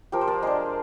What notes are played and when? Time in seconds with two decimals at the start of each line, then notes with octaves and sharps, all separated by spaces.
0.12 F3 G4 A#4
0.21 C5
0.27 A#4 D5
0.42 G#3 D4 G#4 C5